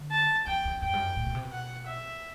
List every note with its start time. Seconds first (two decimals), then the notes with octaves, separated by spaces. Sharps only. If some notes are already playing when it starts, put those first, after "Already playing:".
Already playing: D3
0.11 A5
0.47 E2 G5
0.65 E2
0.82 F#2 G5
0.93 G2
0.99 F#2
1.16 A2
1.26 B2
1.35 C3
1.43 B2
1.51 F#5
1.87 E5